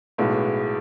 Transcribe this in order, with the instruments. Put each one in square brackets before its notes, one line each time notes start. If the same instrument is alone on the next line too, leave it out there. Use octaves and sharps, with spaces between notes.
[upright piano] B1 A2 G#3 B3 F#4